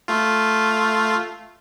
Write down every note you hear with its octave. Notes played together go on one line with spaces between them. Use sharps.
A3 F4